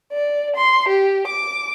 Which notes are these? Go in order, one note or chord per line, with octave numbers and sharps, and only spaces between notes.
D5
C6
G4
D6